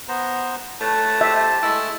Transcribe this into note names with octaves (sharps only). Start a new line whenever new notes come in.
B3 C5 A#5
A3 B4 C#5 A5
G4 C5 E5
G#3 A3 E4 E6